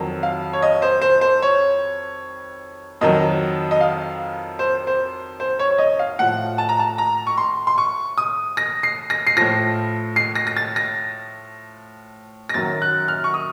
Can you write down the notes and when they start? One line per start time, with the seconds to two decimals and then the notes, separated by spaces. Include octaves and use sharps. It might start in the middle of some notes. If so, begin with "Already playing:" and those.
Already playing: F2 D#3 F#3
0.23 F5
0.53 C#5
0.62 D#5
0.82 C5
1.02 C5
1.21 C5
1.42 C#5
3.01 F2 D#3 F#3 D#5
3.71 D#5
3.81 F5
4.59 C5
4.87 C5
5.40 C5
5.59 C#5
5.70 C#5
5.78 D#5
5.99 F5
6.19 A2 F3 F#5
6.58 A5
6.69 A#5
6.79 A5
6.98 A#5
7.27 C#6
7.38 C6
7.67 C6
7.78 C#6
8.18 D#6
8.57 A#6
8.83 C7
9.10 A#6
9.27 C7
9.37 A2 F3 A#6
10.16 C7
10.35 A#6
10.47 A#6
10.57 A6
10.76 A#6
12.49 A#6
12.54 F#2 D#3 F#3 A6
12.82 F#6
13.08 F6
13.24 C#6
13.34 D#6